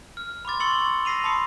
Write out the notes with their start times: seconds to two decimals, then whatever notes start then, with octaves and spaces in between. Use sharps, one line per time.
0.17 F6
0.45 B5 C6 D6 A6
0.60 C6 C#6 E6 C#7 F#7 G7
1.05 E6 A#6 C7 D#7 F7
1.24 A5 B5 C6 D#6 C#7